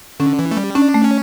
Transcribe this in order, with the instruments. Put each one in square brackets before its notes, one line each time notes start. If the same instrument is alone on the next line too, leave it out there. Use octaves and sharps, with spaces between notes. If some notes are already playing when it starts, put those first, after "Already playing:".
[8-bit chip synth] D3 [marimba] C#4
[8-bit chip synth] E3
A3
G3
[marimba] C#4 [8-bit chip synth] D4
[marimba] A3
[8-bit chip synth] C#4